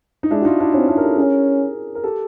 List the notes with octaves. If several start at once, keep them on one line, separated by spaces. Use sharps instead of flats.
D#4
G#3 D4 E4
F#4
D#4 F4
D4 E4
C4 C#4 D#4
D4 E4
A#4
G4 A4
C#4 G#4 A#4
A#4
G4 A4